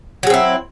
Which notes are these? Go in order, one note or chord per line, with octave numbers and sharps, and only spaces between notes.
F#3 C4 E4 G#4